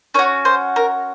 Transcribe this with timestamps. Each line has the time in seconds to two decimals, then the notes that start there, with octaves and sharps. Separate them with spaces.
0.14 C#4 C#5
0.19 F#4
0.45 C5
0.76 A#4